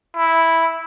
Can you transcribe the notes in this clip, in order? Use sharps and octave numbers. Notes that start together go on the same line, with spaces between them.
E4